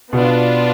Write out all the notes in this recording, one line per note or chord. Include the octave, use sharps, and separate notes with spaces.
B2 B3 D4 F4